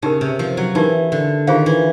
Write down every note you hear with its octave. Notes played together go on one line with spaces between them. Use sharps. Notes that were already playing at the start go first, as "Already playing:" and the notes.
C#3 D#4 G4 A#4
C3
F3
F#3
E3 D#4 G4 A#4
D3
D#3 F4 G#4 C5 F5
E3